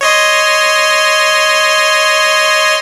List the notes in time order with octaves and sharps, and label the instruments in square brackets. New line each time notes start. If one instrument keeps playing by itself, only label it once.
[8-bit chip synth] C#5 D#5 C6